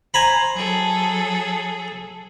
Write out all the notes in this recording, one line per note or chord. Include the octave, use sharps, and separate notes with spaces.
C5 G#5 A#5 B5
F#3 G#4 A4